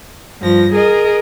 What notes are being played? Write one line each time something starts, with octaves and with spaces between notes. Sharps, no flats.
G2 F3 A#6
G#4 A#4 D#5